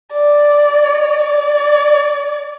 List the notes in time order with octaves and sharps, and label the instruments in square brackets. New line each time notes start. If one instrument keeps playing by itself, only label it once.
[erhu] D5
D5